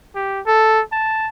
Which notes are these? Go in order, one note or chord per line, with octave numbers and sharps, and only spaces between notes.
G4
A4
A5